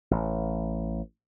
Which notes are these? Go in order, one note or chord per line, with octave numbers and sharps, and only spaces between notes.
A1